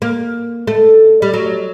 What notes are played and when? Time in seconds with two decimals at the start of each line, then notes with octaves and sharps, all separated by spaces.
0.02 A#3
0.67 A3
1.22 G3
1.34 F#3